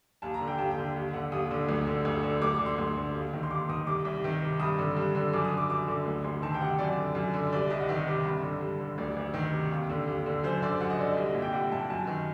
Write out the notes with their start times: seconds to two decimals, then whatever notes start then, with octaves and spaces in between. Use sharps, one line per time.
0.22 D#2 A5
0.34 A#5
0.40 D3
0.47 G5
0.58 D#2 A5
0.71 G5
0.78 D3
0.96 D#2
1.13 D3 F#5
1.32 D#2 D#6
1.51 D3
1.69 D2
1.87 D3
2.05 D2
2.23 D3
2.42 D2 D6
2.54 D3 D6
2.66 C6
2.78 D2
2.97 D3
3.14 D#2
3.33 D#3
3.43 C6
3.51 D#2 D6
3.69 D#3 D#6
3.87 C2 D6
4.05 C2
4.24 D#3
4.42 C3
4.60 G2 D#6
4.78 D3
4.97 G2
5.15 D3
5.33 F#2 D6
5.45 D#6
5.52 D3
5.57 D6
5.70 F#2 D6
5.87 D3 D6
6.05 D2
6.24 D2 C6
6.42 D#3 A5
6.54 G5
6.61 C3 F#5
6.79 F#2 D5
6.97 D3
7.15 F#2
7.34 D3
7.52 C2 D5
7.70 C2 D#5
7.80 F#5
7.88 D#3 D#5
8.07 C3
8.25 G2
8.43 D3
8.61 G2
8.79 D3
8.98 D2 D5
9.17 D2
9.34 D#3
9.53 C3
9.71 D#2
9.89 D3
10.08 D#2
10.26 D3
10.44 F#2 C5
10.62 D3 D5
10.81 F#2 F#5
10.90 D#5
10.99 D3 D5
11.11 D#5
11.17 C2
11.34 A#2
11.42 G5
11.53 C2 F#5
11.72 A#2 A5
11.90 F#2 A5
12.07 D#3